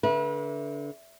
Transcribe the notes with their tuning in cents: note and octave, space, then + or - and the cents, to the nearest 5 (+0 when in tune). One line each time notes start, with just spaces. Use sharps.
D3 -30 B4 -35 E5 +0